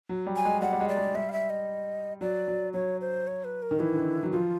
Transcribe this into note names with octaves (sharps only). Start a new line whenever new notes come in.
F#3
G3
G#5
G#3
G3 F#5
G3
G#3
D5
G#3
G3 E5
F5
E5
D#5
F#3 D5
F#3
F#3 C#5
C5
C#5
B4
A#4
D#3
E3 E4
D3
D#3
F#3
F3 F4